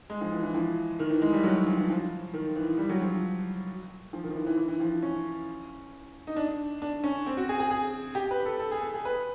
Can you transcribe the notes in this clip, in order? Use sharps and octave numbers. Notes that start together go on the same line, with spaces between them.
G#3
F3
E3
E3
F3
D#3
E3
G#3
G3
F#3
F3
E3
F3
D#3
E3
G3
F#3
F3
F3
D#3
F3
E3
E3
E3
E3
F3
C#4
D#4
D4
D4
C#4
C4
F#4
G#4
G#4
G#4
G4
B4
A4
A4
G#4
A4
G#4
B4